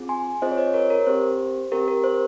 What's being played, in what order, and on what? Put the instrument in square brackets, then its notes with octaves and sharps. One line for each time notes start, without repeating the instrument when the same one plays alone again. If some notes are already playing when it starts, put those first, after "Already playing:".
Already playing: [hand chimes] C4 F4 G#4
G#5 C6
C4 F4 G#4 C5 D#5
C#5
C5 D#5
A#4 C#5
A#4
C4 G4 C5
C4 G4 A#4
A#4
C5